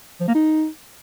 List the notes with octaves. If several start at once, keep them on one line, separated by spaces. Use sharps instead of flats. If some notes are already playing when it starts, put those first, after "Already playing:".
F3
A#3
D#4